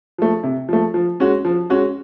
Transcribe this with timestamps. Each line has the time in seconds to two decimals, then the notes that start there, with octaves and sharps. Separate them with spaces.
0.18 F3 A3
0.43 C3
0.69 F3 A3
0.94 F3
1.20 G#3 C#4 F#4
1.45 F3
1.70 G#3 C#4 F#4